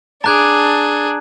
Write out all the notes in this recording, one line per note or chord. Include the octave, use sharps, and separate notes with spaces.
D4 G#4 A5 A#5 D6 F#6 G#6